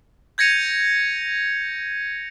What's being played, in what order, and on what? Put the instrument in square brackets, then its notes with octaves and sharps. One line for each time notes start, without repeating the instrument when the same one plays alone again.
[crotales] G6 G#6 A#6 C#7 D#7 F7